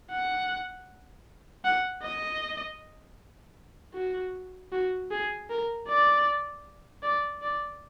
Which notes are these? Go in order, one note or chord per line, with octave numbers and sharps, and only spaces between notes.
F#5
F#5
D#5
F#4
F#4
G#4
A#4
D5
D5
D5